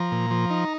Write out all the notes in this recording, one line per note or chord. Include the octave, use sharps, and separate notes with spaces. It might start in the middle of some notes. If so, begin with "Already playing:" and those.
Already playing: F3 A#5
A#2
F3
D#4